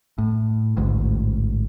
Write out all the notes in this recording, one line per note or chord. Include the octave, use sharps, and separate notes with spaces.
A2
A1 D2 G#2